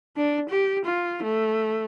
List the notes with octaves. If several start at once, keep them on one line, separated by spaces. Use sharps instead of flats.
D4
G4
F4
A3